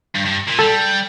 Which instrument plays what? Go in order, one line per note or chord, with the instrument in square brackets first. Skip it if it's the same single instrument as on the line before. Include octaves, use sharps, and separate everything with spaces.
[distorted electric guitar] G2
G2
A#2
[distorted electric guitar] G3 [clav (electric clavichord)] A4